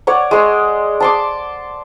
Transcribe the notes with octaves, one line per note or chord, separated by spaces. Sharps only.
C#5 D5 F#5
G#3 C6
A5 C6 D6